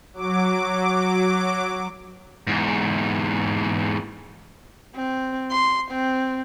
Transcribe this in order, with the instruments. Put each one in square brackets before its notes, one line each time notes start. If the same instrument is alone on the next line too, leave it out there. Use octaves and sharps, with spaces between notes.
[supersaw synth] F#3 D6
[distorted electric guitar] E2 G#2
[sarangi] C4
C6
C4